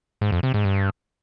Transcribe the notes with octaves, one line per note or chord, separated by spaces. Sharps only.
G#2
F2
C3
G#2
G2